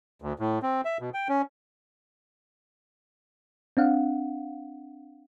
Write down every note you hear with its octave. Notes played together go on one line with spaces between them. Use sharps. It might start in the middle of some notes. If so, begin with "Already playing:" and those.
D2
A2
C4
E5
B2
G5
C#4
C4 D4 F5 F#5